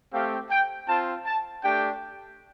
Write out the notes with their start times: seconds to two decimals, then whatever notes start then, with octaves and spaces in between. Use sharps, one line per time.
0.12 A3 C4 G4 F5
0.50 G5
0.87 C4 F4 A5
1.25 A5
1.63 A3 D4 G4 G5